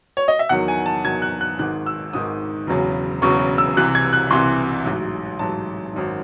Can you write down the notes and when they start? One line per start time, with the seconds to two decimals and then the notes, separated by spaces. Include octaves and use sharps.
0.17 C#5
0.28 D#5
0.39 E5
0.49 E2 D#3 F#3 F#5
0.68 G#5
0.86 A5
1.05 E2 D#3 F#3 G#6
1.22 F#6
1.41 F#6
1.59 G#1 G#2 D#3 F#6
1.86 E6
2.13 G#1 G#2 D#3 D#6
2.67 E1 E2 C#3 F#3
3.22 E1 E2 C#3 F#3 C#6
3.58 E6
3.77 C2 C3 E3 F#6
3.95 G#6
4.13 F#6
4.30 C2 C3 E3 C6
4.86 A1 G#2 F#3
5.39 A1 G#2 F#3 A5
5.94 G#1 F#2 D#3